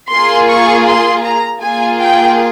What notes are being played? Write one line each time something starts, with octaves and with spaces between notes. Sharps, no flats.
A#3 F4 G#4 C6
C#6
C6
A#5
A#3 F4 G#4 G#5
G5